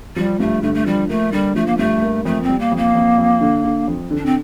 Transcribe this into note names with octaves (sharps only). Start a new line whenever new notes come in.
F3 G3
G2 A3
D3 A3
A3
F3 G3
A3 A#3
D3 G3
F3 A3
A#3
G2 A3
A#3
F2 A3
C4
G3
A#3
F2
A#3
F2
F2
D3
D3
F2
D3
D4
C4